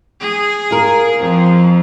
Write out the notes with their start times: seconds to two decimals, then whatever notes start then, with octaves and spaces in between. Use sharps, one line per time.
0.21 G#4
0.71 F4 A#4
1.19 F2 F3